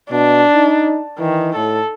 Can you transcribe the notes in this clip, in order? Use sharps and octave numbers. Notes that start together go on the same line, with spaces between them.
B2 D4
D#4
D#3 E3
A2 A4